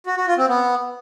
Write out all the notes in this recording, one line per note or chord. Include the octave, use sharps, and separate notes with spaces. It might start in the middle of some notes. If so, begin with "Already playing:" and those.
F#4
F#4
F4
C4
B3